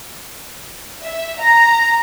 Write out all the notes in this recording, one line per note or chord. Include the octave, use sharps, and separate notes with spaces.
E5
A#5